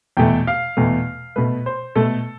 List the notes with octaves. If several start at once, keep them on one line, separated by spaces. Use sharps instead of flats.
E2 B2 A3 G5
F5
E2 B2 A3
B2 A3 B4
C5
B2 A3 A4